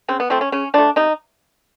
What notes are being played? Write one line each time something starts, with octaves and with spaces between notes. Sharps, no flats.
C#3 C4
B3
F3 A3 C4
C#4
C#3 C#4
F3 A3 D4
C3 D#4